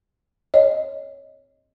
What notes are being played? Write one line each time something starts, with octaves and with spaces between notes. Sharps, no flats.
C#5 D#5